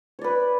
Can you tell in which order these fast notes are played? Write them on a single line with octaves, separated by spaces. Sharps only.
C#5 D5 B4